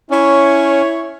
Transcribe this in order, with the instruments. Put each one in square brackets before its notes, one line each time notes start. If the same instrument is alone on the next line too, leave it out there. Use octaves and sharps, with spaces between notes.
[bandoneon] C#4 [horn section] E4 C#5